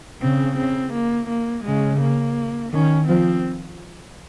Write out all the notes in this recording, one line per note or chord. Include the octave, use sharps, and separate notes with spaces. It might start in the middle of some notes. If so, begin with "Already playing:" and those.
C#3 C4
C4
A#3
A#3
C#3 G#3
A#3
D#3 C#4
F3 C4